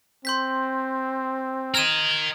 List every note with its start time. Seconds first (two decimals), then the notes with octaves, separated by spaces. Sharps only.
0.25 C4 C6 G6 B6
1.74 A#4 D#5 F6 G#6 E7